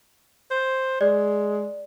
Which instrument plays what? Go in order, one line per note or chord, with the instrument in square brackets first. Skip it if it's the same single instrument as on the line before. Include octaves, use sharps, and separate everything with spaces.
[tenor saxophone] C5
[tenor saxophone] G#3 [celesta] D5